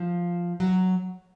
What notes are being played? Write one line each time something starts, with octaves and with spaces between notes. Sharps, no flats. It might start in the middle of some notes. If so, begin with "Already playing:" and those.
Already playing: F3
F#3